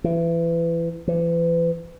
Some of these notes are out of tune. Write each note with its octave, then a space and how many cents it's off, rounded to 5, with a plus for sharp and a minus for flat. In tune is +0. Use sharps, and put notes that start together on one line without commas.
E3 +25
E3 +35